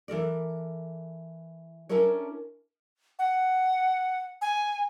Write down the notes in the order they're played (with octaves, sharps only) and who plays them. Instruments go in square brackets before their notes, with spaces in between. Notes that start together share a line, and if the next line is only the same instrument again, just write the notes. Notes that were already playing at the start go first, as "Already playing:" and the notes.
[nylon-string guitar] E3 A4 A#4 D5
C#4 D4 E4 A4 A#4 C#5
[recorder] F#5
G#5